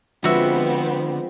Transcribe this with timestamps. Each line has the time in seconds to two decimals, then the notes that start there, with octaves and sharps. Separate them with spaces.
0.24 D3 F3 G#3 B3 C4 F#4 E5